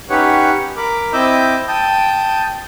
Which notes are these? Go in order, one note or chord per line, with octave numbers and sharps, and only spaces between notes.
C#4 D#4 G4 B4 C#5 F#5
A#4 B5 D6
C4 E4 D#5 D6 E6 G6
G5 A5 D#6 G6